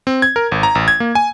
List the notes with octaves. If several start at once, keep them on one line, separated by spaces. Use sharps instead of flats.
C4
G#6
A#4
G#1
A#5
A1
G#6
A#3
G#5